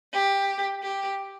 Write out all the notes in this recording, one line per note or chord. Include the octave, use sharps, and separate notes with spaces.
G4
G4